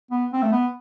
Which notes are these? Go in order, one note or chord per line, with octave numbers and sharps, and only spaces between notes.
B3
C4
A3
B3